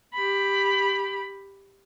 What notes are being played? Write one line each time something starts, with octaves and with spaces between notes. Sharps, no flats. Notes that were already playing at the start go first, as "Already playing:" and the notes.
G4 B5